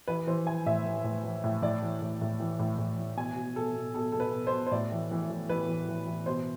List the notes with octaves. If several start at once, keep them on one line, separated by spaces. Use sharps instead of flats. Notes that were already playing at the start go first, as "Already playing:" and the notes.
E3 B4
E3 C5
E3 G#5
A2 E5
E3
A2
E3
A2
A2 D5
E3
A2
A2
E3
A2
A2
E3
B2 G#5
B2
B2 A4
B2
B2 A4
B2 A4
B4
B2
C5
B2
C5
A2 D5
E3
E3
E3
E3 B4
E3
E3
E3
B2 C5